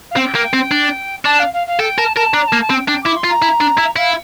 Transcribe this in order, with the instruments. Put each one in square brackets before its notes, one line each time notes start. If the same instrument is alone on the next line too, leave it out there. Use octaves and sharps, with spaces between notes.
[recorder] F5
[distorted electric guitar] C4 [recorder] G5
[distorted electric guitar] A#3
C4
D4
[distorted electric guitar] D4 [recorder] A5
[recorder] F5
F5
F5
[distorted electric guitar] A4 [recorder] G5
[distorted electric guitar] A#4 [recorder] A5
[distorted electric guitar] A#4 [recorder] A5
[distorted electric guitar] D4 [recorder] A#5
[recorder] A5
[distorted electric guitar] A#3
[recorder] A5
[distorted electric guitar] C4
[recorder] G5
[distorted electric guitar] D4 [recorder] G5
[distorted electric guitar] E4 [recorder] D6
[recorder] C6
[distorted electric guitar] F4
[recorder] A#5
[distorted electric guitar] E4
D4
E4
[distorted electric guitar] E4 [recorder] F5